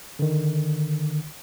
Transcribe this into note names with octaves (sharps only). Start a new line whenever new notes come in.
D3 D#3